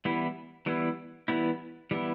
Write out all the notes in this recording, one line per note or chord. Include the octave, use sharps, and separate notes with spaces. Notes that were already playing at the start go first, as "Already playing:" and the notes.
E3 G3 B3 E4
E3 G3 B3 E4
E3 G3 B3 E4
E3 G3 B3 E4